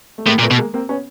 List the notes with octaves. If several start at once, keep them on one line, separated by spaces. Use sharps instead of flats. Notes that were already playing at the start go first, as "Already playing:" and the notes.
A3
A2 G#3 A#3
A#2
A3 B3
B2
G#3 A#3
A#3 C4
B3 C#4